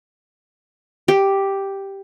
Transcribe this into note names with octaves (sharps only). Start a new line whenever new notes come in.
G4